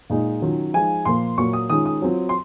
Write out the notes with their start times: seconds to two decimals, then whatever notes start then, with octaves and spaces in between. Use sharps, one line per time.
0.10 A#2 G#3 D#4
0.42 D#3 F#3 C#4 F4
0.73 F3 G#3 D#4 G#5
1.05 A#2 F3 A#3 C6
1.38 A#2 F#3 A#3 C#6
1.53 D#6
1.70 D#3 G#3 C#4 F4 D#6
1.86 D#6
2.02 F#3 C4 F4
2.29 C6